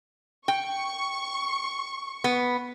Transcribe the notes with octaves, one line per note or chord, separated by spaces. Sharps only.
G5 C#6
B3